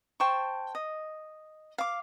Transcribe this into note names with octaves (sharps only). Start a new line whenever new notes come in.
C5 G5 A5 C#6
D#5
F5 D6